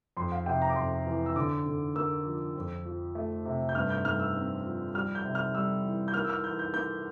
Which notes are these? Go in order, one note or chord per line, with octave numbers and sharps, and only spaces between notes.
F2 C6
F5
C3 G5
A#5
D6
F2 C6
E3
E6
D3 D6
D3
A#3 E6
F3
F2
F3
A3
C3
G6
G2 F6
G6
G2 F6
E6
C4
F3
G3 F6
G6
C3
F6
G3 E6
E3
G6
A#3 F6
E6
F6
E3 G6
G6
A#3 G6